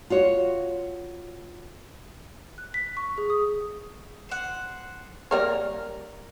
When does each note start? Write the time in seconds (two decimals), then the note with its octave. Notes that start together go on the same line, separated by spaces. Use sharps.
0.10 F4 F#4 C#5
2.58 F#6
2.74 B6
2.97 C#6
3.18 G#4
3.30 D#6
4.29 C5 F#5
5.31 G3 A#3 A#4 C#5 F6